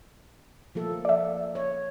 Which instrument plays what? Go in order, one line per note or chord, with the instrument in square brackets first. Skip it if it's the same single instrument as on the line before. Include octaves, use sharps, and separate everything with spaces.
[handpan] F3 A#3 A4
[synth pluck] D5 E5
[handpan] C#5